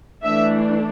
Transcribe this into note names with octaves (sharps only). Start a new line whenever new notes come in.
E3 A3 D4 E5